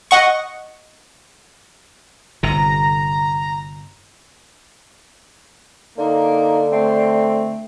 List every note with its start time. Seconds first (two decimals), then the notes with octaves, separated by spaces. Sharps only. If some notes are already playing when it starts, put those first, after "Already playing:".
0.11 D#5 F#5 C#6
2.43 G1 C3 A#5
5.98 D3 A#3 D#4
6.71 A3 C4